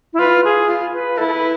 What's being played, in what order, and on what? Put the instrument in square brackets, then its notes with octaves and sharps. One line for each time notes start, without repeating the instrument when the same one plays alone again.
[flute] E4
[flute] F4 [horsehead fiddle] B4
[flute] G#4
[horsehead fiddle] F4
[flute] B4
[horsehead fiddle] E4 [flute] A4
[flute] A4
B4